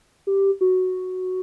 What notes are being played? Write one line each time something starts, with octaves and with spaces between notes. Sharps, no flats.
G4
F#4